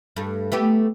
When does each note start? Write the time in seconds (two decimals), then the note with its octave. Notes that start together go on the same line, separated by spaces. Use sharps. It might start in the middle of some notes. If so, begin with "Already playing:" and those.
0.16 G2 A3
0.52 A3 B3 G4